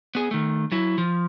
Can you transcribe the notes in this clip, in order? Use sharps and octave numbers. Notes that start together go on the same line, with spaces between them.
B3 G#4
D#3 A3
F#3 E4
F3